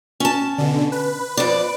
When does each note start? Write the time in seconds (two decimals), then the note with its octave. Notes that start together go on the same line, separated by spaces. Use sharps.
0.20 C#4 A5
0.58 B2 D3
0.92 B4
1.37 F2 D5